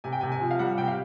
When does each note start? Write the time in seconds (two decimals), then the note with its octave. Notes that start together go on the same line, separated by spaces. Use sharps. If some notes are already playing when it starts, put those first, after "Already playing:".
0.04 C3 G#5
0.12 G5
0.21 C3 G#5
0.32 G#5
0.41 F3
0.51 F5
0.59 G3 F#5
0.78 C3 G5
0.88 F5